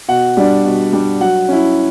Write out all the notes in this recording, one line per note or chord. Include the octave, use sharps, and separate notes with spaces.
B2 F#5
G3 D4
B2
G3 D4
F#3 F#5
C#4 E4